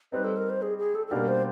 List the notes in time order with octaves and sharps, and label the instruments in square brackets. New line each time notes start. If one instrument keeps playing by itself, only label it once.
[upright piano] G3 C4 D#4 [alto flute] B4
[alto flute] A4
A#4
C5
G#4
G#4
A4
A4
[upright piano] B2 G3 A#3 D4 G4 [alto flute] A#4
[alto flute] C5